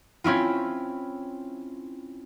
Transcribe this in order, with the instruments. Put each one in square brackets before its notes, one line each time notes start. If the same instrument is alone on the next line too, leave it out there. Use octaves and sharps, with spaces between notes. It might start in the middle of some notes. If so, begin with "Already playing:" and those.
[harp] C4 C#4 E4 F4